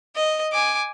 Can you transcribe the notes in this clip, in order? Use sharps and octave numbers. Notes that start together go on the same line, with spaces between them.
D#5
G#5 D6